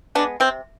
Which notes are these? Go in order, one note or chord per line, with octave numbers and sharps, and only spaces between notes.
G#3 B3 D4
C3 C4